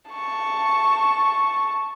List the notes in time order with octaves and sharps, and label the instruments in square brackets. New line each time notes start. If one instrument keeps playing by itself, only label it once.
[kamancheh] A5 C#6